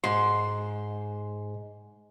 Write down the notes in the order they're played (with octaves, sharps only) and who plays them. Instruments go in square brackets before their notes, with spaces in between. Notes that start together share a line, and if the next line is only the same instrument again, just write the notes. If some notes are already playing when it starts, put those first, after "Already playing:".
[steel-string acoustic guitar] G#2 [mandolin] C6